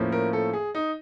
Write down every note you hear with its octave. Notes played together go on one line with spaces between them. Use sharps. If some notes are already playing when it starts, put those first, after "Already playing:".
Already playing: A2 F3 A#3 C#4
A#4
A4
G#4
D#4